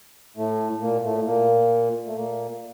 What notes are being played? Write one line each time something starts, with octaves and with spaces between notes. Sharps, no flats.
A2 A3
A#2 A#3
A2 A3
A#2 A#3
A3
A#2 A#3